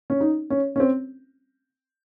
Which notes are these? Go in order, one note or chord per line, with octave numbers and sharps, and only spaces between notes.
C#4
D#4
C#4
C#4
C4